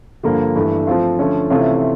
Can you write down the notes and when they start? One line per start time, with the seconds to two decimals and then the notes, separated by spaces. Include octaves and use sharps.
0.23 G2 D3 F3 A#3
0.55 G2 E3 A3 D4
0.87 F3 A3 C4 F4
1.19 D3 F3 A3 C#4
1.50 C3 E3 A3 C#4 F4